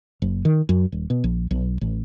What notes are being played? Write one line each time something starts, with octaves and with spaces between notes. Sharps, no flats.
F#1
D#3
F#2
D#1
B2
A#1
B1
A1